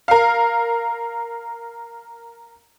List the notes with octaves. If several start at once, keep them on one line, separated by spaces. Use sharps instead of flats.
A#4 F5